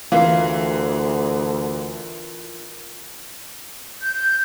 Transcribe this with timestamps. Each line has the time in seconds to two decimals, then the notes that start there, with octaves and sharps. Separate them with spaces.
0.12 D2 E3 F4 A#4 F5 C7
4.02 G6